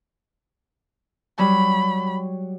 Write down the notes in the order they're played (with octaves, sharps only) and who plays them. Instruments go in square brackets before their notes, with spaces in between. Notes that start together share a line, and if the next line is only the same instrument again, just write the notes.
[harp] F#3 G3 [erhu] B5